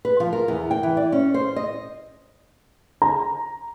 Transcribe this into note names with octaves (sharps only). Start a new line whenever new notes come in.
B4
F3
A#4
E2
G5
E3
D5
C#4
C5
D#5
A#5